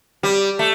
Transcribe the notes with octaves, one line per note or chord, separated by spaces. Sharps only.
G3
A3